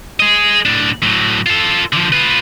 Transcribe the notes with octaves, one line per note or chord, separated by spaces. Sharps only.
G#4 D#5
A2 D4
A2 F#3
F4 A4
D3 F3
F4 B4